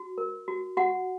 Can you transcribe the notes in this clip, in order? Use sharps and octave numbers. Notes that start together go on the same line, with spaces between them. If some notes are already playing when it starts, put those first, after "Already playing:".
Already playing: F#4
A#4
F#4
F#4 F#5